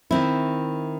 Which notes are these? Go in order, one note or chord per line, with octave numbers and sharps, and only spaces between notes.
D#3 C4 E4